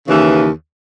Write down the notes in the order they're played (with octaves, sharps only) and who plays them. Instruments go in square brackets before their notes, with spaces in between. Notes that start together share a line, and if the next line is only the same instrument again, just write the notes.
[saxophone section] D#2 C#3 E3